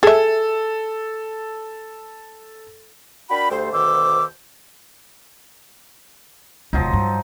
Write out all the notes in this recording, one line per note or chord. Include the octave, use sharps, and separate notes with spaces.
G#4 A4 E5
D4 F#4 A#4 G5 B5
D2 G3 A3 C5
D2 B2 D#3 C5 D6 E6
E1 D2 F3 F#3 D#4
G2